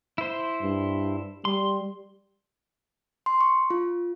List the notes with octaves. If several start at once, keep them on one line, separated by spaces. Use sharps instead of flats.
E4 C5
G2
G3 C6
C6
C#6
F4